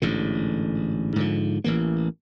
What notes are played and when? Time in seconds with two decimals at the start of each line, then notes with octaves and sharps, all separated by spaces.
0.02 A1 G#2 D3
1.16 G#2 D3 F3
1.64 A1 E3 A#3